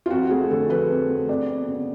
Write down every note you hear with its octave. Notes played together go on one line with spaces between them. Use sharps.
F4
F2 F#4
A3 G#4
D3 A4
F3 B4
F2
A3
F2 D5
B3
C#3